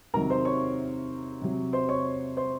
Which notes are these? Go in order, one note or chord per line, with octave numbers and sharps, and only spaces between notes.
C3 D#3 F#3 A#4 A#5
C5 C6
C#5 C#6
C3 F#3
C5 C6
C#5 C#6
C5 C6